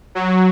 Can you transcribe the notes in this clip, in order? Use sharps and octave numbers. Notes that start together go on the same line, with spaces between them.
F#3